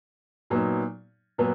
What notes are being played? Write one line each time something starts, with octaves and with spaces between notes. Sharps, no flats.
A#2 F#3 B3 D#4
A#2 F#3 B3